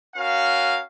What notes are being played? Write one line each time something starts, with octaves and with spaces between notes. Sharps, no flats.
C#4 F#4 A#4 F5